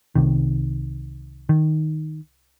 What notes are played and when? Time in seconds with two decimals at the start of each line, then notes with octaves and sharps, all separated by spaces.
0.15 C2 C3 D#3
1.49 D#3